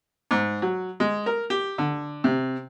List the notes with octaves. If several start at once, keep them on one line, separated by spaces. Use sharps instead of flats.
G#2
F#3
G#3
A#4
G4
D3
C3